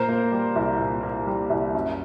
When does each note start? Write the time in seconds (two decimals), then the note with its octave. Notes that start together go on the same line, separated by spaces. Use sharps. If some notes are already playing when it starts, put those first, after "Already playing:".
Already playing: A#2 A#4 C5
0.09 A#3
0.32 G3
0.56 C2
0.79 A#2
1.03 A#3
1.27 G3
1.50 C2
1.75 F#2